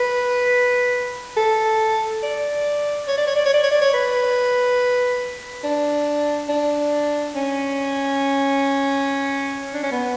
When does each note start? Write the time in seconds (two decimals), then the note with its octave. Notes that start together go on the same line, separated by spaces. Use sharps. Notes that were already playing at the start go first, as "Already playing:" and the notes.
Already playing: B4
1.37 A4
2.23 D5
3.08 C#5
3.17 D5
3.27 C#5
3.36 D5
3.45 C#5
3.54 D5
3.63 C#5
3.71 D5
3.81 C#5
3.93 B4
5.64 D4
6.49 D4
7.35 C#4
9.74 D4
9.83 C#4
9.91 B3